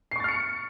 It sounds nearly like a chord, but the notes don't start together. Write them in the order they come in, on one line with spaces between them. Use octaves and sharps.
C7 C#6 A6 F6 C#7